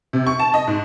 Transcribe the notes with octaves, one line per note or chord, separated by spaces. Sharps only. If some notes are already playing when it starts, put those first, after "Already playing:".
C3
C#6
A5
D#5
G#2